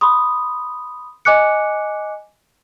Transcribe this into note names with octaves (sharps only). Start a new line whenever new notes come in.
B5 C6 D#6
D#5 G#5 D6 F#6 C#7